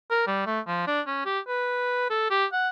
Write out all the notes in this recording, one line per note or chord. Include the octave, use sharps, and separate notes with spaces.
A#4
G3
A3
F3
D4
C#4
G4
B4
A4
G4
F#5